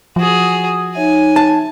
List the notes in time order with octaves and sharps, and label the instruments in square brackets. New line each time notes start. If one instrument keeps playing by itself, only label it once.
[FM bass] F3 [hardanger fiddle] F#4 G#4
[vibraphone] D#4 C#5 E5 [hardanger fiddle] G#5
[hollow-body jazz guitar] A5